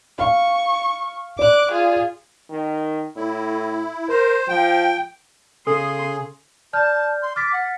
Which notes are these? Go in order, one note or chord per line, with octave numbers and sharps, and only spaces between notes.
F5 C#6
D5 D6 F#6
F4 G#4
D#3
A2 E4
A#4 C5
F3 G5
C#3 G#4 A4 C6 D#6
D5 A5 F6 G6
C6
D6 F6 A6 B6
F#5